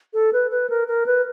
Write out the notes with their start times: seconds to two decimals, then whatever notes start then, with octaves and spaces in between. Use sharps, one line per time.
0.14 A4
0.33 B4
0.51 B4
0.69 A#4
0.88 A#4
1.06 B4